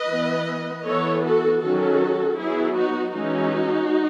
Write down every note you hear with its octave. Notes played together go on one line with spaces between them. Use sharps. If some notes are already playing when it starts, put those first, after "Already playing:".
Already playing: B4 D#5
E3 B3
E3 B3 A4 C#5
F#4 A4
D#3 F#3 C#4 F#4 A4
F#3 B3 E4 G#4
D#4 F#4
E3 G#3 C#4 D#4 F#4